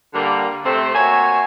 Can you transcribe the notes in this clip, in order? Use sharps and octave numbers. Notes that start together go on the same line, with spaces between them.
D3 G3 A#3
C3 A3 C4
A#3 F#4 C#5 E5 G#5